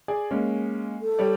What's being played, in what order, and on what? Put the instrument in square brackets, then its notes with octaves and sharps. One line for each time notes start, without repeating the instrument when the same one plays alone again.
[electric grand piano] G#4 D5 G#5
G#3 A#3 C#4
[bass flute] A4
[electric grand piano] G3 C#5 D5